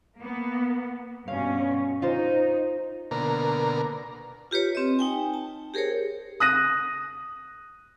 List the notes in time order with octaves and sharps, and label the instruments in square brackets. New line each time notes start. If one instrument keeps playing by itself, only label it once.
[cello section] A#3 B3
[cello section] G2 B2 C#4 [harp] F5
[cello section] D#4 [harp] F4 C5
[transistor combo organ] B2 D3 A#3 A#4
[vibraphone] F4 G4 B4 C#5
C4 D#5
D#4 G5 G#5
A5
G4 G#4 A#4 C5 C#5
[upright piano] D#6 F#6 A#6 D#7